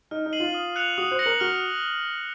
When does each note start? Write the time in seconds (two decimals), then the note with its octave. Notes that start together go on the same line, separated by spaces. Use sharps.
0.11 D#4 F6
0.26 D#4
0.33 C7 D#7 F#7
0.40 F4
0.54 D#6
0.76 F#6 C#7 F7
0.98 F#4 D#6
1.11 C5
1.19 A#6 C#7 F#7
1.26 A#4
1.40 F#4 F6